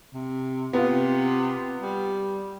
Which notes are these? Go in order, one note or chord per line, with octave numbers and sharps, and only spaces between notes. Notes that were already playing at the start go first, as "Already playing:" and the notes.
C3
C3 B3 F4
G3